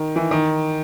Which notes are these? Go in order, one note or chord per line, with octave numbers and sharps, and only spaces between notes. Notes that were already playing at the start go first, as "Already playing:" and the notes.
Already playing: D#3
E3
D#3